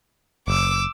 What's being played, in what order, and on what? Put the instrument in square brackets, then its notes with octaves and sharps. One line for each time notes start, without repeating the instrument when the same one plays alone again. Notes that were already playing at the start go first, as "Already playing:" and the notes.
[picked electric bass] F#1 [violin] D6 E6